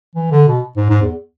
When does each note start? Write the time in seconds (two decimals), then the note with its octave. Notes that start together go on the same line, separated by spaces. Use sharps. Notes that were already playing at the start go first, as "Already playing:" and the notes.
0.15 E3
0.32 D3
0.48 B2
0.77 G#2
0.90 G#2
1.02 E2